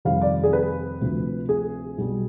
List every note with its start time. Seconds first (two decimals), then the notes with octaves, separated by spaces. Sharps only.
0.05 F2 C3 D#3 G3 F5
0.21 D5
0.43 G#4
0.53 B4
1.01 D2 C3 F3
1.49 G#4
1.98 B1 B2 G3